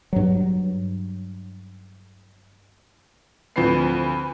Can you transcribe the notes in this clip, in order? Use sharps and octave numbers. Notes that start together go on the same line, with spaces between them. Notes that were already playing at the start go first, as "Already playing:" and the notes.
G2 F#3
D2 F3 C4 F4 B4 C7